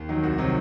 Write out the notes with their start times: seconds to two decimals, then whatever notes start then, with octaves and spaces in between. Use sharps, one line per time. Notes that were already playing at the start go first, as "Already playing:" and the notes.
Already playing: D#2
0.09 D#3 F#3
0.23 C2 F#4
0.38 C3 D#3 F#3